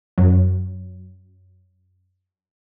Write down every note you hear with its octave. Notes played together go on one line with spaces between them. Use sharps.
F#2 F#3